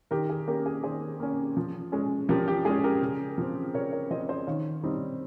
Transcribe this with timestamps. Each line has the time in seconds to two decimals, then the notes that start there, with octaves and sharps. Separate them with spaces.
0.11 D#3 G4 A#4
0.30 G#4
0.47 A#3 C#4 G4 A#4
0.66 G#4
0.84 D#3 G#4 C5
1.20 A#3 C#4
1.57 F3
1.92 G#3 C#4
2.29 F3 G4 A#4
2.48 G4
2.65 G#3 C#4 G#4
2.84 G4 A#4
3.02 C#3
3.38 F3 C4
3.74 C#3 A#4 C#5
3.92 A#4 C#5
4.11 F3 C4 C5 D#5
4.29 C5 D#5
4.47 D#3 C#5 F5
4.84 G3 C4 D#4